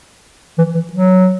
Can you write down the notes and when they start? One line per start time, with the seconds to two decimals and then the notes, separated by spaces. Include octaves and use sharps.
0.58 E3
0.75 E3
0.93 F#3